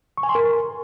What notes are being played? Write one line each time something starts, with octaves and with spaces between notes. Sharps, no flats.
C#6
G#5
C6
A#4